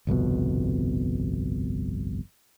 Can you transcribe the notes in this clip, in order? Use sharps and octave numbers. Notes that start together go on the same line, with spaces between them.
G1 C2 F2 B2